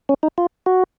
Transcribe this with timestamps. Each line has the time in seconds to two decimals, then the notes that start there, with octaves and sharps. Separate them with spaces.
0.09 C#4
0.23 D#4
0.38 F4
0.66 F#4